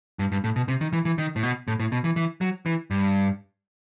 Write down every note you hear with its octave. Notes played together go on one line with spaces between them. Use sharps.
G2
G2
A2
B2
C3
D#3
E3
E3
D#3
A2
B2
A2
A2
B2
E3
E3
F#3
E3
G2